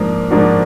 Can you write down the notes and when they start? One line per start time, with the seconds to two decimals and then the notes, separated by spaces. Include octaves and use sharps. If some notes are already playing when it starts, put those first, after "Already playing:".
Already playing: G#2 F3 A#3 D4
0.30 G#2 F3 A#3 D4 F#4